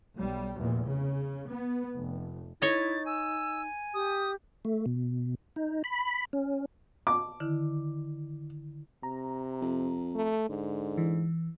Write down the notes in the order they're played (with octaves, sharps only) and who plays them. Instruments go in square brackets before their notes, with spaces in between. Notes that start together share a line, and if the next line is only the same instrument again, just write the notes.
[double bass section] B1 G3
F1 E2 A#2
C#3
B3
F1
[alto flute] D#4 [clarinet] E4 [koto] C#5 D#5 [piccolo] A6
[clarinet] G#5 [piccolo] E6
[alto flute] G4 [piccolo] D#6
[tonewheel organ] A3
B2
D#4
B5
C#4
[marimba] A5 [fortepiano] D6
[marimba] D3 D#3 E4
[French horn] C3 [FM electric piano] A#5
[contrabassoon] F2
[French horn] A3
[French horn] G#2 [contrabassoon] D3
[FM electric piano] E3